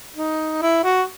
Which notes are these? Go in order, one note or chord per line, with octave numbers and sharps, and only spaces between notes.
D#4
E4
F#4